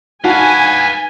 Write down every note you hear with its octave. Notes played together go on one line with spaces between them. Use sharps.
D#4 F#4 B4 F5 G#5